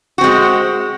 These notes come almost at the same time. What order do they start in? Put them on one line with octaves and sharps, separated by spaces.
F#4 C4 G#3